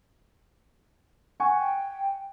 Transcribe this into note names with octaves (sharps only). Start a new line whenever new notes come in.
F#5 G#5 C#6
G5